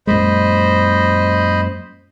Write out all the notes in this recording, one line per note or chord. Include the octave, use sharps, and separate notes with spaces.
F#2 A#2 G#3 C5 D#5 B5